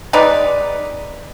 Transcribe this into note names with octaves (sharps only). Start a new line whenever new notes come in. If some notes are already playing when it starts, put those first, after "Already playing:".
G#3 D#4 B4 D5